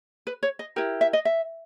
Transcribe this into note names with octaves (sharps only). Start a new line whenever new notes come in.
B4
C#5
D#5
E4 G4 A#4
E5
D#5
E5